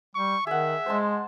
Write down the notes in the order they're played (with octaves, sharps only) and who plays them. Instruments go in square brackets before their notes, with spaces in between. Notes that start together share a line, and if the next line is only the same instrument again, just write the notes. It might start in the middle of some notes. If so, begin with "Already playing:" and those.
[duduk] G3 [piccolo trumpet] C#6
[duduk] D#3 [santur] G#4 F#5 [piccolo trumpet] E5
[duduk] G#3 [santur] C5 A5 C6